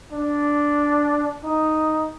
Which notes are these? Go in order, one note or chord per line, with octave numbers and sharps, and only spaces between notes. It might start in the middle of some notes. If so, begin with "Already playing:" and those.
D4
D#4